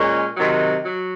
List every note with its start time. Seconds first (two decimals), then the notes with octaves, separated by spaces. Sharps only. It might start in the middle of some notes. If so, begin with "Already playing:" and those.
Already playing: A#2 G#3 C#4
0.37 C3 D#3 F#3
0.86 F#3